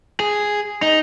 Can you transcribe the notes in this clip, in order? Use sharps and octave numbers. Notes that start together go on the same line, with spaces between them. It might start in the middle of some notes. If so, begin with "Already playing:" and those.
G#4
D#4